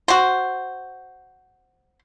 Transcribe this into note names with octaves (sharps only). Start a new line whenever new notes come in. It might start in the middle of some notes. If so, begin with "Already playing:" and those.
F#4 C5